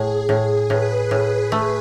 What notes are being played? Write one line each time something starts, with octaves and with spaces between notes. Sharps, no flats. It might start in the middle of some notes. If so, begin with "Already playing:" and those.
Already playing: A2 G#4
A2
A2 B4
A2
A3